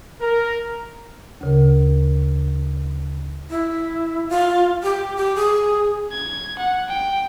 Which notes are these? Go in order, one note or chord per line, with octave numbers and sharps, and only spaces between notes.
A#4
D2 C#3 A#4
E4
F4
G4
G4
G#4
G#6
F#5
G5